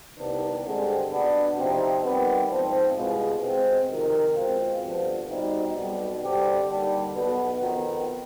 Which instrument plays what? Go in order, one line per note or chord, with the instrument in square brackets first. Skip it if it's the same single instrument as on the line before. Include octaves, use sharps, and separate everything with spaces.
[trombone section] C2 C3 D#3 B3 D4
G2 D3 G#3 C4
B2 B3 D4
C3 F3 C4 D#4
D#3 G3 B3
G#2 F3 C4
C2 B2 G#3 B3 F4
B2 G#3 C4
F2 C3 D#3
B2 G#3 C4 F4
G2 D3 F3 B3
B2 G3 C4 D#4
B1 B2 G3
G2 D3 G3 C4 G4
D#2 D3 G3
B1 B2 B3
F2 D#3 B3